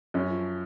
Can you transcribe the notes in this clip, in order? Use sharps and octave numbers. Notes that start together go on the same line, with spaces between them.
F#2 C#4
F3